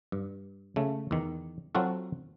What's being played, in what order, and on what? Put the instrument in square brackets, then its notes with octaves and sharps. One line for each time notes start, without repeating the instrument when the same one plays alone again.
[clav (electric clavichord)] G2
C#3 A3
E2 D#3
F#3 C4 F4 F#4 A4